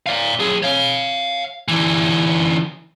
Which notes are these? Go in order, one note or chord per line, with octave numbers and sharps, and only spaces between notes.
D5 F5
F#3 G#4
C#5 F5
D3 E3